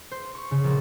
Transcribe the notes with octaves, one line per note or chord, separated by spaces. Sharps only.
C5
C#6
C#3
A#1